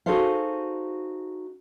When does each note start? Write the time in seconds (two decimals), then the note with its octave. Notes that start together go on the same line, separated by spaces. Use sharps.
0.06 D#4 F#4 G#4 A4 C5 F5